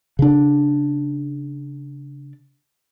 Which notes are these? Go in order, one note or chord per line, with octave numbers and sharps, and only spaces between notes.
C#3 D4